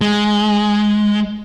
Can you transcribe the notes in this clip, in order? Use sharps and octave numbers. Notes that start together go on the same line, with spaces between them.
G#3